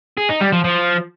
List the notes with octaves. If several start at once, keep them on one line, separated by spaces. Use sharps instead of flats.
G#4
D#4
G3
F3
F3